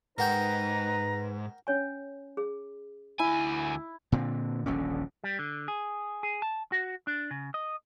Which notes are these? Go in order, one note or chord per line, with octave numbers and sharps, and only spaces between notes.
G#2 D#4 A#4 B4 F#5 G5 A#5
C#4 C#5 G#5
G#4
D2 E4 G#5
A#2 D3 C4
D#1 A#1 D3 C#4
G3
D3
G#4
G#4
A5
F#4
D4
C#3
D#5